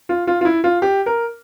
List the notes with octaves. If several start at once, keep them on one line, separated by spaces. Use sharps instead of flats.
F4
F4
F4
E4
F4
G4
A#4